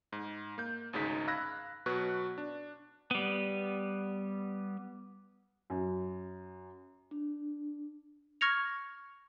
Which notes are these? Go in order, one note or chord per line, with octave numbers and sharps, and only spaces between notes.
G#2
A#3 G6
G#1 D2 C#3 G#3 D#4 B6
F5 B5 E6 F#6 G#6 A#6
B2 F#3 B4 C#6 F#6
D4
G3 B3
F#2
D4
C#6 F6 G#6 A#6 C#7 F7